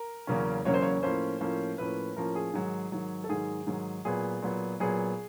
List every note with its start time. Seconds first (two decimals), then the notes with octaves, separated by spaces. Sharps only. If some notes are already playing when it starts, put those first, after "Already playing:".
Already playing: A#4
0.27 E2 C#3 F#3 A#3 C#4
0.65 E2 C#3 F#3 A#3 C#4 C#5
0.74 C5
0.82 C#5
1.03 A2 F3 A#3 C#4 C5
1.41 A2 F3 A#3 C#4
1.78 A2 F3 A#3 C#4 B4
2.17 A2 F3 A#3 C#4 A#4
2.36 G#4
2.54 G#2 D#3 F#3
2.92 G#2 D#3 F#3
3.24 A4
3.29 G#2 D#3 F#3 G#4
3.67 G#2 D#3 F#3
4.05 A#2 F#3 B3 G#4
4.42 A#2 F#3 B3
4.80 A#2 F#3 B3 G#4